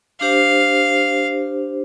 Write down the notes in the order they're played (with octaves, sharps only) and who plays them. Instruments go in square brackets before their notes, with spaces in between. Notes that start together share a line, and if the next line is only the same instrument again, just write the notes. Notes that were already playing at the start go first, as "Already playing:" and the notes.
[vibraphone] D4 G4 C5 [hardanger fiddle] F5